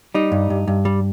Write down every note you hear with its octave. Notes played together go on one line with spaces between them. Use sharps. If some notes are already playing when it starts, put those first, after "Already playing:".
G3 D#4
G2
G2
G2
G3